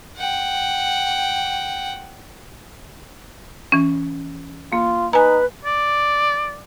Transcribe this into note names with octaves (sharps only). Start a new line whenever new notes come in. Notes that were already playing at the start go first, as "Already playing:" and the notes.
F#5 G5
E3 C#4
A#3 F4
D#4 B4 G#5 A#5
D5